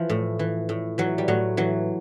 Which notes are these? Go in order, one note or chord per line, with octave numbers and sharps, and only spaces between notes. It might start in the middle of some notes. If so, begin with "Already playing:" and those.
Already playing: E3 F3
A2
E3
A2
E3 F#3
G3
A2 F#3
E3 F#3